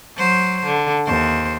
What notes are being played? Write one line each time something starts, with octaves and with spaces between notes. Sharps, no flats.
F#3 C5
D3
D#2 C5